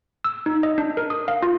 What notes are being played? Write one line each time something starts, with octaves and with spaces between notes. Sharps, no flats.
E6
D#4
D#5
D4
A#4
D#6
F5
F4